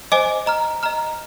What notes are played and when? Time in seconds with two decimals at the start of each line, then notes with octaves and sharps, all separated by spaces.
0.12 C5 D#5 G#5 D6
0.46 D#5 A#5 F6
0.83 D#5 A#5 F6